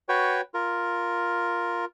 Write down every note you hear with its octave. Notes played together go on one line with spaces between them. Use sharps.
F#4 B4 C#5 G5
F4 A#4